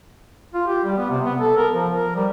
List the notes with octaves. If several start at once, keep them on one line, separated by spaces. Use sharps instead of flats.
F4
G4
G3
B3
C3
B3
A4
A#4
F3
A#4
G3